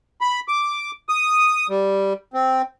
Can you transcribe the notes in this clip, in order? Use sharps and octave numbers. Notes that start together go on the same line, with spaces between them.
B5
D6
D#6
G3
C4